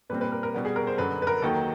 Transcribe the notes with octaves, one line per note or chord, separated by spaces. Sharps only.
A#2 G3 C4 B4
B4
A#4
A#4
B2 G3 B3
G#4
A#4
C5
F#2 D3 F#3 B4
B4
A#4
D#2 D#3 F#3 A4